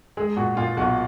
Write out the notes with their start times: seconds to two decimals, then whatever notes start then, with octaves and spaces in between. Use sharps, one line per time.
0.17 G#3 G#4
0.36 A#2 F#4
0.57 A#2 F4
0.77 B1 F#4